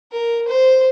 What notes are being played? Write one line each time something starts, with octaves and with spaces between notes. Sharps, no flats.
A#4
C5